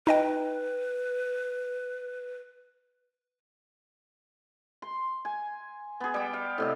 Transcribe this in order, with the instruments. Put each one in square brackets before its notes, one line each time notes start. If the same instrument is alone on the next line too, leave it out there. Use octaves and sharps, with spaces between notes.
[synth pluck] D#4 D#5 G5 [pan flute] B4
[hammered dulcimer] C6
G#5
B3 G#4
G3 G5
F5
A2 C3 D#5